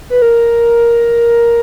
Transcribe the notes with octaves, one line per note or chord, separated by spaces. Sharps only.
B4
A#4